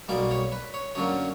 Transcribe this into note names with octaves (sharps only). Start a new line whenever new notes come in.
B1 B2 G3 A#3 D5
C#5
B4
C#5
F#2 D3 F#3 A#3 C#5